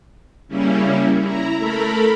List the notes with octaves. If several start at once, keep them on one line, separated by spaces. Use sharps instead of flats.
C#3 G3 A#3 C#4 E4
E4 A#5
A3 A4 A#4 B5